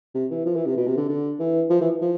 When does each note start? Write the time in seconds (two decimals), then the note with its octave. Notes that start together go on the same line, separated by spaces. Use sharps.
0.14 C3
0.30 E3
0.46 F3
0.56 E3
0.66 C3
0.77 B2
0.87 C3
0.97 D3
1.08 D3
1.39 E3
1.70 F3
1.81 E3
2.01 F3